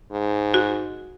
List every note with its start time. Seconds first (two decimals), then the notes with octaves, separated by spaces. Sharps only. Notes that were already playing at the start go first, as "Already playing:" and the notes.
0.11 G#2
0.54 F#4